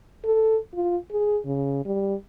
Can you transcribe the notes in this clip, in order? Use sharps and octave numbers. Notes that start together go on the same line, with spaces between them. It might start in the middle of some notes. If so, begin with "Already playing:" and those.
A4
F4
G#4
C#3
G3